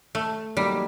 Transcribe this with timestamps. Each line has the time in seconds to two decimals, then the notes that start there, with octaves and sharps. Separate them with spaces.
0.15 A3
0.57 F#3 G3 A#3 D#4